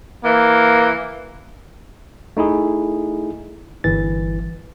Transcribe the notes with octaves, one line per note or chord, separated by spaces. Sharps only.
E3 A#3
A3 D#4 E4 G#4
G1 E3 A6